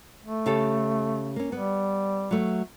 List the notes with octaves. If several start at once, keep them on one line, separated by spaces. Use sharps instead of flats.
A3
C#3 G4 A4
A#3 C#4
G3 B3
F#3 A3